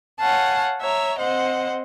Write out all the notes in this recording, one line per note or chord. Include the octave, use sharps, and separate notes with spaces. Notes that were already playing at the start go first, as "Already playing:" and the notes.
C#5 F5 F#5 G#5 A5
C#5 E5 A#5
C4 C5 D#5 F#5